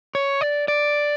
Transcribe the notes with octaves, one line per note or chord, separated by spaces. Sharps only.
C#5
D5
D5